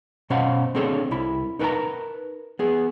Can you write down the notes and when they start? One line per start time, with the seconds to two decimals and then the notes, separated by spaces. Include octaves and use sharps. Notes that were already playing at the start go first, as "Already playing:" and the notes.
0.30 B2 C#4 C5 F5 F#5 B5
0.75 C4 D4 G#4 A4 C5 C#5
1.11 C2 E4 B5
1.59 D#4 A#4 B4 G5 A5 A#5
2.59 B3 G#4